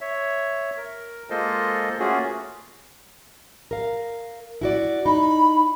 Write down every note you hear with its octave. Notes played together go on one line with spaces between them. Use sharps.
C#5 E5
A#4
G#3 A#3 F4 A4 C5 D#5
A3 A#3 C#4 F4 F#4 G#4
A#4 F5
E4 F#4 D5
D#4 B5